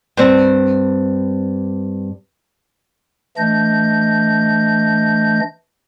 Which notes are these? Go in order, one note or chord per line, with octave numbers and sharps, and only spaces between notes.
G2 C4
E3 A3 D4 D#5 G6